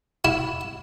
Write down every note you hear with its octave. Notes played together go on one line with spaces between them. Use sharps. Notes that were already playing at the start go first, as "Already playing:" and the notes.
E4